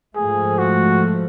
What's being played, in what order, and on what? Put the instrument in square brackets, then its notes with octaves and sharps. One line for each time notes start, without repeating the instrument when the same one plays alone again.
[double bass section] G#2 F3 A3 [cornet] G#4
[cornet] F#4